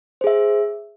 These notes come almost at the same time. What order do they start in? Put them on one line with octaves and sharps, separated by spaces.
C5 G#4 E5